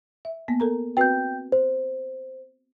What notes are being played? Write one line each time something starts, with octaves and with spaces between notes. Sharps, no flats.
E5
A#3 B3
A4 A#4 A#5
C4 F#4 B4 G5 G6
C5